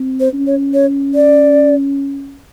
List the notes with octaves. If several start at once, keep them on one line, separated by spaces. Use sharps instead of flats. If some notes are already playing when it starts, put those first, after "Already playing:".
Already playing: C4
C5
C#4
C#5
C#5
D5